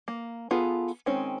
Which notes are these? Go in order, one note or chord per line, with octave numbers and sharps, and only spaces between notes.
A#3
B3 F4 G#4 A4
D#3 G#3 C4 C#4